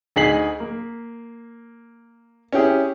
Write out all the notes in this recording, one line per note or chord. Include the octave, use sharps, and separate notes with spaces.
D2 D#4 G#4 B6 C7 F#7
A#3
C#4 E4 G4 G#4